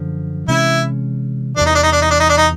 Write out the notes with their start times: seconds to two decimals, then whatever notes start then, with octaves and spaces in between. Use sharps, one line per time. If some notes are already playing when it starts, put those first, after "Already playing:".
Already playing: F#2 D3 F3
0.48 C3 E3 G#3 C#4 E4
1.56 E2 C3 E3 D4
1.66 D#4
1.75 D4
1.83 D#4
1.92 D4
2.02 D#4
2.11 D4
2.20 D#4
2.29 D4
2.37 D#4